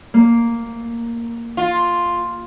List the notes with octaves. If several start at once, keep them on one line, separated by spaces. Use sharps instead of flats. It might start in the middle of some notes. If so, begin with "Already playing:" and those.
A#3
F4